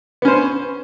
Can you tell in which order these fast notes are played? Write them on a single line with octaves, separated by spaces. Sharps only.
B3 C#4 C5